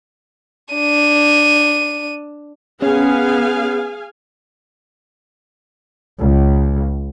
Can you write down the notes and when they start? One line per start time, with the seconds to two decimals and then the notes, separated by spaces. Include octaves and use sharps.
0.74 D4 D#7
2.82 B3 C#4 G#4 F5 G#5
6.19 C#2